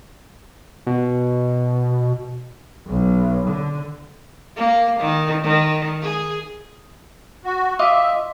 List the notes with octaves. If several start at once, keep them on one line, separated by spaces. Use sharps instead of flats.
B2
B1
D3
A#3
D#3
D#3
G#4
F#4
F4 D#5 E5 D6